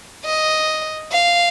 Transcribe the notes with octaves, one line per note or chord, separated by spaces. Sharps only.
D#5
F5